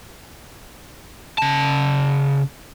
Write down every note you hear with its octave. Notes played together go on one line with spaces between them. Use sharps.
C#3 A5